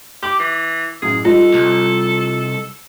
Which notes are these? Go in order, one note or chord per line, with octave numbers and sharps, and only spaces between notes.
G4 D6 F#7
E3
A1 F#2 G#4
G3 D#4 F4 A4
C2